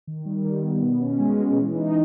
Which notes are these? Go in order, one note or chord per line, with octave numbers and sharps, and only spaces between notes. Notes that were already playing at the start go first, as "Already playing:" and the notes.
D#3
G3
D#3
B3
B2
C#4
G#3
B2
E3
D#4